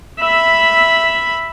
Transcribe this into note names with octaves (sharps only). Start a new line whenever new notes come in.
E5 B5